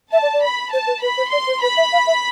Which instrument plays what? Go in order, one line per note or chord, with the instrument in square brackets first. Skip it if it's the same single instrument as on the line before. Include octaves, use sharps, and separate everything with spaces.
[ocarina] E5 [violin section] A5
[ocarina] D5
D5
[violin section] B5
[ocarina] C5 [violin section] A5
[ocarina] B4
[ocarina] B4 [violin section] B5
[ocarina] C5
[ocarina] D5 [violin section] C6
[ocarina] C5
[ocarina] B4 [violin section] B5
[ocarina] E5
F5
E5